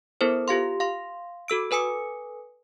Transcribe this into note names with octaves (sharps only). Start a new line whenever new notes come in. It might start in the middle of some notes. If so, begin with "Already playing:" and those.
B3 E4 A4 A#4 C5
F4 G4 F5 C6
F5 C6
F#4 A4 E6 D7
A4 B4 G#5 D#6 C#7